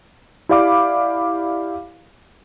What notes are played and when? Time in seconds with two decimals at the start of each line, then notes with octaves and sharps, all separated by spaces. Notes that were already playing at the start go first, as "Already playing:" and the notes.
0.49 E4 G4 D5 F5 B5 D6